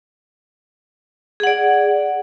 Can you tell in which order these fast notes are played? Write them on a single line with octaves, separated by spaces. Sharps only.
G#4 F#5 D5